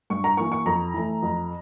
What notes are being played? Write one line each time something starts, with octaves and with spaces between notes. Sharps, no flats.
G2 C#6
A#5
E3 A#3 C#6
C#6
F2 A#5
E3 A3
F2